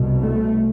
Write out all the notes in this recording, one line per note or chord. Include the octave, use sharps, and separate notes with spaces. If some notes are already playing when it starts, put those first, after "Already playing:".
Already playing: C2 B2
A3